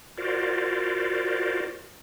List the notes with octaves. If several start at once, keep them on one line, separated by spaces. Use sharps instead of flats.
F4 F#4 A#4 C5 D5